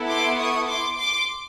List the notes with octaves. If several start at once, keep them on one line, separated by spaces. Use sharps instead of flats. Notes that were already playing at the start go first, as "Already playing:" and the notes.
Already playing: B3 E4 A4
C6 D6
C#6 D#6
C6 D6
C6 D6